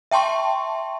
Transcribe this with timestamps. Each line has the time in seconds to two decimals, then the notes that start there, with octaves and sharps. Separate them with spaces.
0.11 E5 G5 A5 C6 C#6